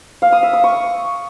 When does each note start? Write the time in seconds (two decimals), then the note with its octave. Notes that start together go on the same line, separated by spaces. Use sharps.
0.22 F5
0.32 D#6
0.43 E5
0.53 D#6
0.64 C#6